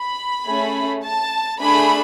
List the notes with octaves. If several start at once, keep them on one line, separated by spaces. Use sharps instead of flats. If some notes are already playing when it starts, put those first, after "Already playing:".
Already playing: B5
A3 C#4 G#4
A5
A3 D4 G#4 B5